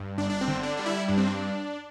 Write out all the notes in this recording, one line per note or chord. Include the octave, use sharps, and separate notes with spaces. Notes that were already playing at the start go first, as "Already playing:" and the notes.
Already playing: G2
G1 D4
D4
C4
D3
D4
G3 D4
E4
G2 D4
C4
D4